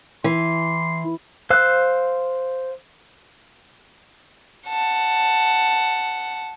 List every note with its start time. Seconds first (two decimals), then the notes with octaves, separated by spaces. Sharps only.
0.24 E3 C6
1.50 C5 F5 E6 F#6
4.69 F#5 A5